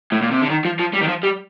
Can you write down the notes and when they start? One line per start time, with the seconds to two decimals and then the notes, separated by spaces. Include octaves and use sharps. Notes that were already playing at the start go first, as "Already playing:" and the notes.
0.12 A2
0.22 A#2
0.32 C3
0.41 D3
0.50 D#3
0.65 F3
0.79 F3
0.93 G3
1.01 D#3
1.08 F3
1.23 G3